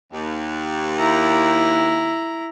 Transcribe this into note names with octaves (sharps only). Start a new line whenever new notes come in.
D#2
E4 A#5